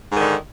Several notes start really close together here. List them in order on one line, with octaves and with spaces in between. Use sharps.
G#2 D#3 D3